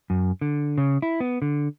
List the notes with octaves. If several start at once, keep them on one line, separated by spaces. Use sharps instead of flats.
F#2
D3
C#3
E4
B3
D3